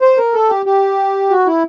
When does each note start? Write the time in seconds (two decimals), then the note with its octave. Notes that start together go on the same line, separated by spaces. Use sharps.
0.02 C5
0.18 A#4
0.34 A4
0.49 G4
0.66 G4
1.30 F#4
1.46 E4